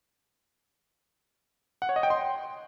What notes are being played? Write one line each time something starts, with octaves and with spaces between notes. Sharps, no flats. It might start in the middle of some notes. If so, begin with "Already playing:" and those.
F#5
C#5
D#5
G5
C6